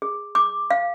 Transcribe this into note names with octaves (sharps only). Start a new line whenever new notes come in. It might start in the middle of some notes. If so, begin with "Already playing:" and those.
G#4
D6
F5